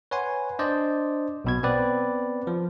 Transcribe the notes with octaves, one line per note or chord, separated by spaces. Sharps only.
B4 C#5 F#5 G#5 C6
D4 C5 D5 D#5
B1 B2 G#6
B3 C4 B4 D5
F3